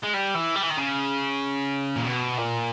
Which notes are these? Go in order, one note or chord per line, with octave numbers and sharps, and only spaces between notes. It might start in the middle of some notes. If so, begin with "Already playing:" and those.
G#3
G3
E3
G3
E3
D#3
C#3
A#2
B2
A#2